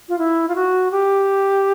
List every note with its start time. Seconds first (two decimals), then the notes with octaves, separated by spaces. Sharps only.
0.09 F4
0.19 E4
0.49 F4
0.55 F#4
0.92 G4